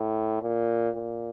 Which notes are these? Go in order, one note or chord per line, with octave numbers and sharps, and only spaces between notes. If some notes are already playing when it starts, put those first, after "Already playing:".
Already playing: A2
A#2
A#2